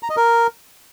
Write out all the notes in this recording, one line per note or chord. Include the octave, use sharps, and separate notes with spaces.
A#5
D#5
A#4